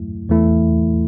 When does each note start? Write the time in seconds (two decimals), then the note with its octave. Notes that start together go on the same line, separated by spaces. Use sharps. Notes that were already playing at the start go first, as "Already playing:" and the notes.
Already playing: F#2 F#3 A3 E4
0.29 E2 E3 A3 E4